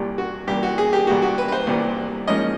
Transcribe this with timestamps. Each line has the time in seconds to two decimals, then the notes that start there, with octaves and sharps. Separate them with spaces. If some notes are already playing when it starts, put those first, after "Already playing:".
Already playing: C2 A#2 G3
0.18 F#4
0.47 C2 A#2 G3 G4
0.63 F#4
0.78 G#4
0.93 G4
1.07 C2 A#2 G3 F#4
1.22 F#4
1.38 B4
1.48 B4
1.52 C5
1.67 C2 A#2 G3
2.28 G#2 F3 A#3 C#4 D#5